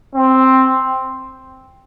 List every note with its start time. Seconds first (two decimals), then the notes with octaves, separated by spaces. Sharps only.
0.15 C4